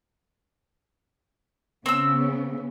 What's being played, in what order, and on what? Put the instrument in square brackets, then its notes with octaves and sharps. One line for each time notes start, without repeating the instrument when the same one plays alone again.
[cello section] C#3 B3 [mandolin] C4 E6